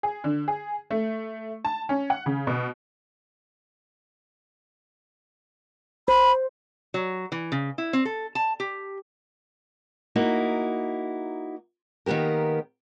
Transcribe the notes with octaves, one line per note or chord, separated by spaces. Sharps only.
G#4
D3
G#4
A3
A5
C#4
F#5
C#3
B2
C5 B5
F#3
E3
C#3
E4
C4
A4
A5
G4
A#3 D#4 E4 F#4
D#3 A#3 B3 G4 A#4